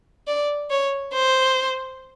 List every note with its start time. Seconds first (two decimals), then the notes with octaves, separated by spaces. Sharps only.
0.28 D5
0.70 C#5
1.14 C5